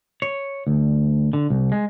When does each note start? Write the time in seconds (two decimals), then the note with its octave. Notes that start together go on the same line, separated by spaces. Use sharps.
0.22 C#5
0.67 D2
1.33 D3
1.50 C2
1.72 G#3